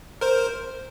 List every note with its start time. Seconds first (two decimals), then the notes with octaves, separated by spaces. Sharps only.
0.21 A#4 C5